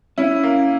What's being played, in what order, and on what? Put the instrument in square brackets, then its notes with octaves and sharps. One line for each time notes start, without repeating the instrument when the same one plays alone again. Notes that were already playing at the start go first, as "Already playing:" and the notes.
[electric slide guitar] C#4 [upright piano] E4
[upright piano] A#3